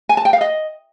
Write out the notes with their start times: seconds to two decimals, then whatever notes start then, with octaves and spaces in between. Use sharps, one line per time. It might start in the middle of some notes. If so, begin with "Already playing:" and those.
0.09 G#5
0.17 A5
0.25 G5
0.33 F5
0.41 D#5